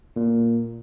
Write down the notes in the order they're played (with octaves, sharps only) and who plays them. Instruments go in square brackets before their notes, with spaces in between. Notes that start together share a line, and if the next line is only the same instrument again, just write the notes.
[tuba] A#2